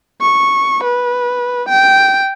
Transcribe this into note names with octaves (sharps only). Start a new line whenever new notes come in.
C#6
B4
G5